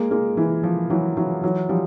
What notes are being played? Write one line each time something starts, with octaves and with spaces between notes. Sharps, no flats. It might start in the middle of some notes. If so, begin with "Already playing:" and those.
Already playing: G#3 A#3
G#3 A#3
E3
F3
E3 F#3
E3 F#3
E3 F#3
F3 G3